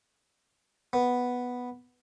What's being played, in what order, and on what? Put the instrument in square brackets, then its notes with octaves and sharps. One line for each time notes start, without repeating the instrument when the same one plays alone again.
[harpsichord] B3